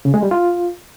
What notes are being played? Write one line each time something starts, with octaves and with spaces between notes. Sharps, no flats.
C#3
G#3
G3
F4